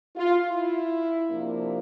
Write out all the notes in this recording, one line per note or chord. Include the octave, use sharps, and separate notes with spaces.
F4
E4
C3 F3 A#3 D4